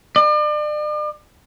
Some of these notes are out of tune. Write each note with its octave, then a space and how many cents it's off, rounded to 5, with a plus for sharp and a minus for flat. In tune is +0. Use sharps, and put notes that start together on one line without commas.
D5 +40